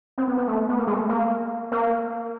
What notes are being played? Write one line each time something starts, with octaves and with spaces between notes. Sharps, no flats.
C4
B3
B3
A3
B3
A#3
G#3
A3
A#3
A#3